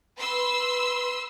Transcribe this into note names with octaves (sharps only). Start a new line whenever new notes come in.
B4 C6 E6